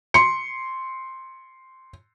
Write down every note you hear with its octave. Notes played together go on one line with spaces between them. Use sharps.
C6 C#7